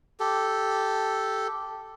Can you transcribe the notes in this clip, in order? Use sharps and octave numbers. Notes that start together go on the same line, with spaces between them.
G4 A4